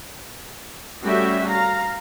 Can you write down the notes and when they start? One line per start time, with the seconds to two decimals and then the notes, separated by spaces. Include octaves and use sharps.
1.02 G3 A3 C#4 F#4 G4 E5
1.47 F5 A#5